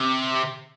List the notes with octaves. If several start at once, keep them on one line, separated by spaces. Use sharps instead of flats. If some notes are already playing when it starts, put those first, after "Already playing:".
Already playing: C3